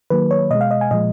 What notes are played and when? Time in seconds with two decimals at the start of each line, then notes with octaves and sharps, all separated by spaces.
0.10 D#3 F#3 A#3 B4
0.31 C#5
0.51 B2 G#3 D#5
0.61 F5
0.71 D#5
0.81 G#5
0.91 A#2 F3 G#3 D#5